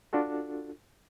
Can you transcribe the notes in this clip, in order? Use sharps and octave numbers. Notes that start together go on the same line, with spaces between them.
D4 F4 F#4 A4